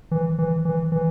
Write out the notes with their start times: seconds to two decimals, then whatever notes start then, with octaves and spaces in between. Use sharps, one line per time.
0.11 E3
0.38 E3
0.65 E3
0.92 E3